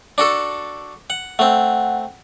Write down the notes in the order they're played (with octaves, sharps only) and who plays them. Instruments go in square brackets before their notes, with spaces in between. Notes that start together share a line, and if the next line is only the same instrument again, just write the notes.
[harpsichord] D4 F#4 A4
F#5
[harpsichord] A3 C4 [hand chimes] F#5